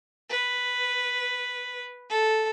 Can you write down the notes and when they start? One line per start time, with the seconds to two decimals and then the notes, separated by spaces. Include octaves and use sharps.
0.30 B4
2.10 A4